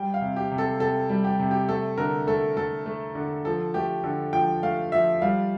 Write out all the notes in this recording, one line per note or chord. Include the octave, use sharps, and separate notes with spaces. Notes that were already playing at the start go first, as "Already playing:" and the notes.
Already playing: G3 G5
F5
C3
G4
C3
A4
C3 A4
G3
G4
C3
G4
A3 A4
D3 A#4
A3 A4
A3 A4
A3
D3
F3 A4
A3 G4
D3 A4
F3 G5
A3 F5
F3 E5
G3 F5